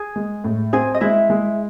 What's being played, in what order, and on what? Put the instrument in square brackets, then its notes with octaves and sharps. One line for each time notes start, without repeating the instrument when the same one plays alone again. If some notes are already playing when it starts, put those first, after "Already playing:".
Already playing: [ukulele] G#4
[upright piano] G#3
A2
[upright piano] C4 [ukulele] G#4 G#5
[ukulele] D#5
[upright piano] G#3 [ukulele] E4 E5
[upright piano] G#3